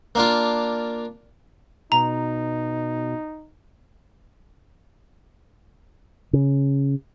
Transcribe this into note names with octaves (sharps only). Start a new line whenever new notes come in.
A#3 D4 F4
B2 D#4 A#5
C#3